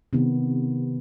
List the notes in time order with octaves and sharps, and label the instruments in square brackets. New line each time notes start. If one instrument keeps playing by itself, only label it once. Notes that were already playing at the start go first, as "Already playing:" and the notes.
[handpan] C3 D#3 B3